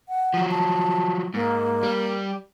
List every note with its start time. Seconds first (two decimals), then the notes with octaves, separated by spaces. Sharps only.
0.09 F#5
0.34 F3 F#3
0.51 A5
1.34 G#2 A#3
1.83 G3